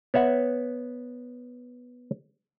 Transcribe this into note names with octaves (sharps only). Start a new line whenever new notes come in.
B3 C#5 E5 F#5